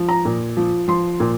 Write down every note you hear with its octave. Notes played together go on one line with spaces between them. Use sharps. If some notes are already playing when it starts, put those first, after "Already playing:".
Already playing: F3
A#5
A#2
F3
F3 C6
A#2